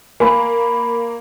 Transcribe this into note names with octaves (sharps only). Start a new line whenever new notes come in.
A#3 G#5 B5